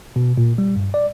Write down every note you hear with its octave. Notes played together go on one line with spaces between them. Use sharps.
B2
A#2
G3
G2
D5